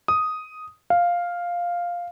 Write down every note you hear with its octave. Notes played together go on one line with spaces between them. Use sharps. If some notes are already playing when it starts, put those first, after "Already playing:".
D#6
F5